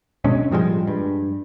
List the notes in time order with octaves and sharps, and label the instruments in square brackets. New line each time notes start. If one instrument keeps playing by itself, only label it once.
[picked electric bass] B2 D3 G#3 C#4
A2 F3 G3 G#3
G2